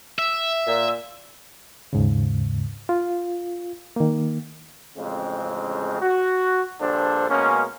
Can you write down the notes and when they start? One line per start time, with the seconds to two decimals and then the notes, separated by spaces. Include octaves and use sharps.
0.19 E5
0.66 A#2
1.93 D#2 G#2 C#3
2.89 F4
3.96 D#3 A#3
4.98 A1 F2 C#3 G#3 C4
6.02 F#4
6.81 A#1 G2 D4 A4 C5
7.30 B2 G#3 A#3 C#4